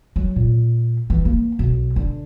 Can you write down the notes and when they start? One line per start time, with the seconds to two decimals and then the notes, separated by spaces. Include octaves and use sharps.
0.16 F#3
0.36 A#2
1.10 E3
1.25 A#3
1.59 B1
1.96 D3